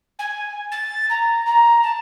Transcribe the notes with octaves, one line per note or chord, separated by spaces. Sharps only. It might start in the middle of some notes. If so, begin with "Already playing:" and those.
G#5
A6
A#5
A#5
A5